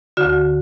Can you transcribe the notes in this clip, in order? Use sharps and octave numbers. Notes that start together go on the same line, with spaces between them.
D2 D3 F#4